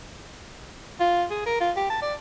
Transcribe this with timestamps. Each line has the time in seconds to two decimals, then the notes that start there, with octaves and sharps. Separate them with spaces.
1.00 F4
1.30 G#4
1.46 A#4
1.61 F4
1.76 G4
1.90 A5
2.02 D5